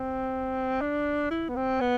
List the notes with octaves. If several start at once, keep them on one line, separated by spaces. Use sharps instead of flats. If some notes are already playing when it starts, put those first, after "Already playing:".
Already playing: C4
D4
E4
B3
C4
B3